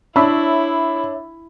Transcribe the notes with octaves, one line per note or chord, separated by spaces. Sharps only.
D4 E4 C#5 E5 B5